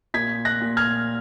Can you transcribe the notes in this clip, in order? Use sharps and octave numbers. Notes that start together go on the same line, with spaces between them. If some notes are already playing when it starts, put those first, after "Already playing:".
A#2 G#6 B6
F#6 A#6
A#2
F6 G#6